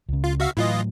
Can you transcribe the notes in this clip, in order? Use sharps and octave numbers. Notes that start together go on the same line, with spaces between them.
C#2 C#3
F4
F#4 E5 F5
A2 E3 F#3 F4 D#5